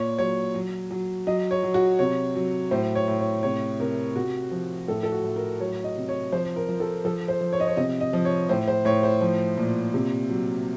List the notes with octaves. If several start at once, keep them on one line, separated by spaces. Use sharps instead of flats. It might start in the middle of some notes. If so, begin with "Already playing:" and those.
Already playing: A#2 C#5
F#3 C#5
F#3
F#3
F#3 D#5
C#5
F#3
F#4
C3 C#5
F#3
A2 C5
C#5
A2
C#5
C3 C#5
C3 A#4
C3 F#4
F3
A2 A4
A4
F#4
A2
A#4
F#3 C#5
D#5
C3
C#5
F3 C5
A#4
F3
A4
F3 A4
C5
F3
C#5
D#5
C#5
C3 D#5
D#5
F3
C#5
A2 C5
C5
A2 C#5
C5
F3
A#2
C3
F#3